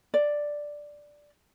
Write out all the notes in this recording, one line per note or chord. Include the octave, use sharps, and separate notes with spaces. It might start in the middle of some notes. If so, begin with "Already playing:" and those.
D5